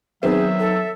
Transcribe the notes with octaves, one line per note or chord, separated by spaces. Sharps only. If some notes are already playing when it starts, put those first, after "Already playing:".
D#3 F#3 B3 C4 G#4 E5
A4